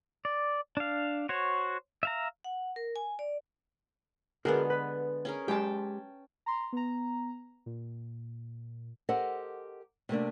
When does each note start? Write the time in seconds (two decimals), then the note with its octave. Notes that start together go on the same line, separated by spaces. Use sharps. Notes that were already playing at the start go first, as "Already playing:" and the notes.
0.25 D5
0.77 D4 F5
1.29 F#4 C5 C#5
2.03 E5 F5 A#5
2.44 F#5
2.76 A#4
2.96 G#5
3.19 D5
4.45 D3 G#3 B3 F#4 G#4 A#4
4.70 B4
5.25 C#4 G#4 A#4
5.48 G#3 G4 G5 A5
6.46 A#5 C6
6.73 B3 A#5
7.66 A#2
9.09 G4 A4 A#4 C5 D#5 F#5
10.09 C3 A3 A#3 D4